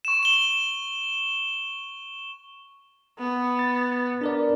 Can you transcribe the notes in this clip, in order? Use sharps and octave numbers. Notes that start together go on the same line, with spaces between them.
C#6 E7
E7 G7
B3
A6
D4 A#4 D5